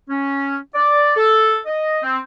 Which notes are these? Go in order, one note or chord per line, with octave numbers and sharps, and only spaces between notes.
C#4
D5
A4
D#5
C4